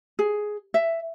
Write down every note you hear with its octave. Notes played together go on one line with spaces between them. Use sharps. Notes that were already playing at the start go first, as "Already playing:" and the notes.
G#4
E5